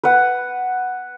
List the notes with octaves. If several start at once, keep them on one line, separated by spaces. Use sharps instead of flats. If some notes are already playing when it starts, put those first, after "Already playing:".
B4 F#5